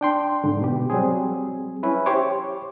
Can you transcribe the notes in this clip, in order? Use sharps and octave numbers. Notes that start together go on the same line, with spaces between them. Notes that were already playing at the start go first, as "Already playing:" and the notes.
D4 G5 C6
G#2 D3
B2 G4
F#3 G3 C4 G#4
C#4 E4 B4
G4 C5 C#5 D6